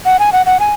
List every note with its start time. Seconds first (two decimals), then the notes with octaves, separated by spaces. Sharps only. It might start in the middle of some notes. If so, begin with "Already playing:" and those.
0.05 F#5
0.19 G#5
0.33 F#5
0.46 F#5
0.60 G#5